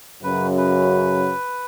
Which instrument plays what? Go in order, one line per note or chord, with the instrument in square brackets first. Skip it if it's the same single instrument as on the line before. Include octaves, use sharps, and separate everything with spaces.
[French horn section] F#2 C#3 F#3 [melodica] B4
[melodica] B4